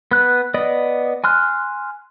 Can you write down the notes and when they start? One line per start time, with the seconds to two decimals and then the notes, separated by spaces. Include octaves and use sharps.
0.11 B3 F#6
0.54 B3 D5 D#5
1.24 G#5 C6 F6 F#6